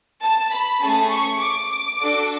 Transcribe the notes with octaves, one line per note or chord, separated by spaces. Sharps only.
A5
B5
A3 C#4 G#4 A5
C#6
D6
D4 F#4 A4